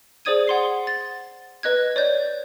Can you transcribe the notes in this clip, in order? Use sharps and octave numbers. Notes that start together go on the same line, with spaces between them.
G#4 C5 D5 D#6 G#6 D#7
F#5 C6 C7
A6
B4 D#5 F#6 G#6
C#5 D5 G6